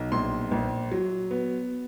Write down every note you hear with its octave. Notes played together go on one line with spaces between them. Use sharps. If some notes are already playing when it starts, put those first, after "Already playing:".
Already playing: B1
A#1 C6
A#1
F#3
B3